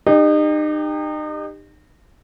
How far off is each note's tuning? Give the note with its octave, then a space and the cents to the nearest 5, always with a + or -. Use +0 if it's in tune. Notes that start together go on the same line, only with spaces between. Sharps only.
D#4 -35 G4 +25